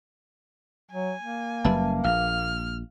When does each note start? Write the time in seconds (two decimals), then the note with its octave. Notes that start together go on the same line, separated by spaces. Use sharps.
0.91 F#3 G#5
1.21 A#3
1.65 F#1 F#2 G3 B4 E5 A5
2.04 A#1 F5 F6